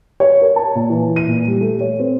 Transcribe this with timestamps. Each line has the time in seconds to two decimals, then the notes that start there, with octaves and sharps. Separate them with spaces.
0.20 C#5
0.42 A#4
0.56 A5
0.75 A#2
0.90 E3
1.16 D#7
1.28 A#2
1.47 G3
1.61 A3
1.81 C#5
2.00 C4